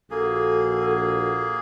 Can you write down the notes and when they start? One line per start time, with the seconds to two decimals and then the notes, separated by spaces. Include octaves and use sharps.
0.11 A#1 A#3 F#4 G#4 A4